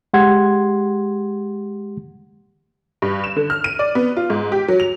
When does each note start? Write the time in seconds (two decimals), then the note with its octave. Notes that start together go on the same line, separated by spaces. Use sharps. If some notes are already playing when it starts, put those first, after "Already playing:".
0.13 G#3 G4 F#5 C6 G#6
3.02 G2
3.24 E7
3.36 D3
3.50 F6
3.64 D#7
3.79 D5
3.95 B3
4.17 F4
4.30 G#2
4.52 G4
4.68 F#3
4.80 F7